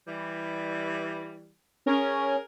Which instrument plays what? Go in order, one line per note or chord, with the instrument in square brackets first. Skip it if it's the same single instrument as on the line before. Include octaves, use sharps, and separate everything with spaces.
[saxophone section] E3 G3
[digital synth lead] C#4 [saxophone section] G#4 A#4